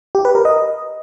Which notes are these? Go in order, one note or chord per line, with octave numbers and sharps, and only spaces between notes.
G4
B4
A#4
D#5